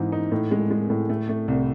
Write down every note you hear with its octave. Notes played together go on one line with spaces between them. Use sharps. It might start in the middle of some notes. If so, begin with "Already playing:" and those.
Already playing: G#2 E3 D#4
D#4
A2
G#3
G#3
A2
A3
A3
C2